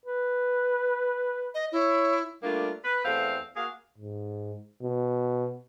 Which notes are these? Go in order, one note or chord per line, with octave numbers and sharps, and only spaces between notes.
B4
D#5
E4 C#5
G3 A3 A#3 D4 F4
B4
E2 A3 C4 F5
A#3 F#4 G#4 A#4 F5
G#2
B2